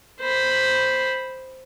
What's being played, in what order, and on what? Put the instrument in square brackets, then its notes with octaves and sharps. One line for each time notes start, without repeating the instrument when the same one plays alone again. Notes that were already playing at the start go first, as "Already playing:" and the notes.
[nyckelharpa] C5 B5